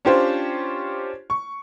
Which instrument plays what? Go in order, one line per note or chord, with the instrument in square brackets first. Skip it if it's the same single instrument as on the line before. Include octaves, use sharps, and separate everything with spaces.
[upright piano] C#4 D4 F4 G4 C5 C#5
C#6